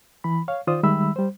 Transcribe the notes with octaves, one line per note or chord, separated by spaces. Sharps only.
E3 B5
C#5 F5
D#3 F4 C5 D5 D#6
D#3 G3 G#3 E5 B5 E6
G3 C5